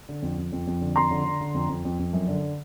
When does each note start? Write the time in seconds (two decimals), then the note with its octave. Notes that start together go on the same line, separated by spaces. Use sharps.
0.09 D3
0.22 F2
0.38 F2
0.52 F2
0.67 F2
0.81 D3
0.96 F2 A#5 C6
1.11 D3
1.25 D3
1.41 D3
1.54 F2
1.69 F2
1.85 F2
1.99 F2
2.13 F#2
2.28 D3